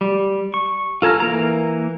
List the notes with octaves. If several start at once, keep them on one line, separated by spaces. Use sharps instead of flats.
G3
C#6
F4 A4 G#5 A#5 F6
E3 A#3 A#5